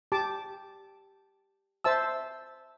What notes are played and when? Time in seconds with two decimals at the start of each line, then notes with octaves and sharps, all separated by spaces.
0.12 G4 A5 D6
1.84 C5 E5 A5 E6